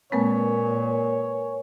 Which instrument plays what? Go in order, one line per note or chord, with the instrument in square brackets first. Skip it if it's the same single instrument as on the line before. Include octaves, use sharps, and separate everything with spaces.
[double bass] A#2 [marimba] G#3 A#3 C4 [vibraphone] A#4 B4 G#5 [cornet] C#5